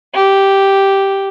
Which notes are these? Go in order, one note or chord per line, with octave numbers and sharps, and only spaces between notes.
G4